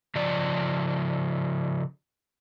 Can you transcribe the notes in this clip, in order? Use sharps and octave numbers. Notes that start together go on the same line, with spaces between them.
C#3 F3 D5